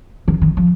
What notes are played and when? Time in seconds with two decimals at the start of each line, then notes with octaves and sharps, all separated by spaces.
0.28 D#3
0.42 D#3
0.57 F3